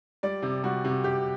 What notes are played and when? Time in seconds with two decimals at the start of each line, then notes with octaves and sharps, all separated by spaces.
0.23 G3 D5
0.42 C3
0.63 G3 F#4
0.84 C3
1.04 C3 G4